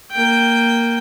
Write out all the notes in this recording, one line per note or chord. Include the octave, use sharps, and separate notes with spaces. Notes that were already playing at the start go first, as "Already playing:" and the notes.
A#3 G5